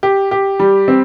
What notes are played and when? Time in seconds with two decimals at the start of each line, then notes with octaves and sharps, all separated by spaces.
0.03 G4
0.31 G4
0.59 G3
0.88 C4